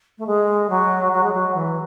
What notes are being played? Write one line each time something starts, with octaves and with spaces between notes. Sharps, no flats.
A3
G#3
F#3
F#3
G#3
F#3
E3